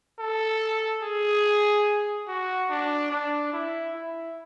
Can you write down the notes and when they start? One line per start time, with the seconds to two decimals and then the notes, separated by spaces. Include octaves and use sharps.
0.19 A4
1.03 G#4
2.28 F#4
2.70 D4
3.11 D4
3.53 E4
3.95 E4